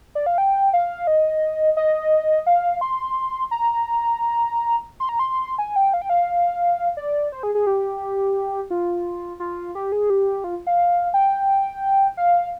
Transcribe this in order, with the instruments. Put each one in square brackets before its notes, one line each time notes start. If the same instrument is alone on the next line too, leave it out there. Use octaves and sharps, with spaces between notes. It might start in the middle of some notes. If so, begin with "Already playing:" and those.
[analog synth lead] D5
F5
G5
F5
D#5
D#5
F5
C6
A#5
C6
A#5
C6
G#5
G5
F5
G5
F5
D5
C5
G#4
G#4
G4
F4
F4
G4
G#4
G4
F4
F5
G5
F5